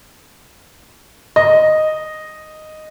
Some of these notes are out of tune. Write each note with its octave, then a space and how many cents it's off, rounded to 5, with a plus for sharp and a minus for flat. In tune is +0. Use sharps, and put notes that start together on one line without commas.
D#5 -5